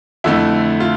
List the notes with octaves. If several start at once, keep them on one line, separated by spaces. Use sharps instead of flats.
F2 D3 A3 E4
F4